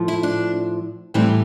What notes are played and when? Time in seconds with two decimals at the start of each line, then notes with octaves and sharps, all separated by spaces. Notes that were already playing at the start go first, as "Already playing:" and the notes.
Already playing: A2 F3
0.08 E4
0.23 D4
1.14 A2 E3 G3 C4